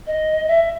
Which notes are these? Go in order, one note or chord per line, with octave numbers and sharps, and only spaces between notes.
D#5
E5